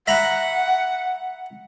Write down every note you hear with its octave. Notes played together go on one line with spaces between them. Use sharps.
E5 F#5 A#5 B5